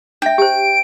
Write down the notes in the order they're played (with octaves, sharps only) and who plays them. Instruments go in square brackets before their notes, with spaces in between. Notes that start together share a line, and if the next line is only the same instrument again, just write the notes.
[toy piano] D4 E5 [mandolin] G5
[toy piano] G4 C5 [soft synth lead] D7